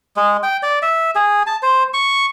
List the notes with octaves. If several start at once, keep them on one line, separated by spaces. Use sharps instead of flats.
G#3
G5
D5
E5
G#4
A5
C5
C#6